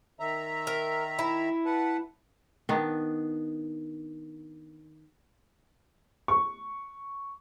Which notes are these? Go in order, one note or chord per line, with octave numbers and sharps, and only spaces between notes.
D#3 E5 A#5
A#4
E4
B4 F#5 A5
D#3 B3 D4
C#6